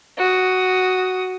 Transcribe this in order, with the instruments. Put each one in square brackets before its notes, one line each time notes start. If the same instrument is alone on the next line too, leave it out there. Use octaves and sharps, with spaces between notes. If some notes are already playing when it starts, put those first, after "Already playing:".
[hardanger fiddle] F#4 D#6